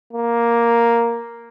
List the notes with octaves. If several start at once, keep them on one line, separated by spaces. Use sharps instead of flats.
A#3